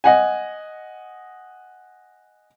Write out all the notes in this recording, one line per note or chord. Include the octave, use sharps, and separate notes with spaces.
D#5 F#5 G#5